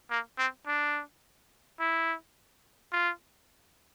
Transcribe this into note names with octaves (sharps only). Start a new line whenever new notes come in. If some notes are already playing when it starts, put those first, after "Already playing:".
A#3
C4
D4
E4
F4